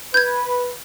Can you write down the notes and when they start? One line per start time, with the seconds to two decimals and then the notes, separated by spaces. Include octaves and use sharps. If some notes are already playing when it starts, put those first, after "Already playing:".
0.14 B4 G6 G#6